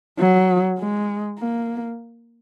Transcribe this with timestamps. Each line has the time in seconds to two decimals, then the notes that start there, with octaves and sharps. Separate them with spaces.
0.19 F#3
0.79 G#3
1.39 A#3